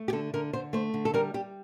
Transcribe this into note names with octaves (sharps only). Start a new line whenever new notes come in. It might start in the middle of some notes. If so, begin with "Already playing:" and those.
Already playing: A3
G4
D3 A4
D3 A#4
D3 C5
A3 C5
D3
A4
G3 A#4
G3 G4